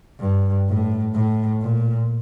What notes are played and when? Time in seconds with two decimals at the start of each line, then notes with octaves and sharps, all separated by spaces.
0.20 G2
0.68 A2
1.15 A2
1.62 A#2